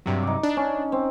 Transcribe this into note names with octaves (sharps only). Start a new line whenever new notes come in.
G2 C3 F#3
D#4 D6
D4
C#4
C4